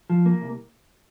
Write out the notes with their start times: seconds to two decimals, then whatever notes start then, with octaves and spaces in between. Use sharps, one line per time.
0.10 F3
0.26 A#3
0.41 C2